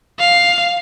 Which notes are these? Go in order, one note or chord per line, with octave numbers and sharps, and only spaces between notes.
F5